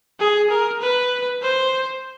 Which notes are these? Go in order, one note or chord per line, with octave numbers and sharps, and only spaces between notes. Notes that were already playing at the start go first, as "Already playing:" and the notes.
G#4
A#4
B4
C5